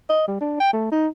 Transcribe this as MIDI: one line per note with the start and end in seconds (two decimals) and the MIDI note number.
0.09 0.25 75
0.28 0.38 55
0.41 0.59 62
0.60 0.72 79
0.73 0.88 57
0.92 1.07 63